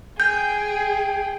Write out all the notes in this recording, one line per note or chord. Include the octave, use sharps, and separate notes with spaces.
G#4 G5 G6